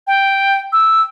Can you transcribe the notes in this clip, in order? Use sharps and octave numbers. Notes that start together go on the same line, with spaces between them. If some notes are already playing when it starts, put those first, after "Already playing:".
G5
E6